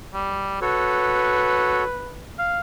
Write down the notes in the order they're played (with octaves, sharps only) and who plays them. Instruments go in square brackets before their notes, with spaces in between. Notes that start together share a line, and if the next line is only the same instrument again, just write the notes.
[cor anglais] G3
[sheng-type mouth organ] F#4 A4 C#5 [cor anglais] B4
[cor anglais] F5